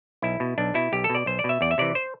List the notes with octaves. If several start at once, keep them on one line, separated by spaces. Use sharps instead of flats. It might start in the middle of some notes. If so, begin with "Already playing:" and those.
B1 E4
B2
B1 D4
B2 E4
B1 G4
A4
B2
D5
B1 C5
D5
B2
E5
E2 D5
E5
C3 E3 D5
C5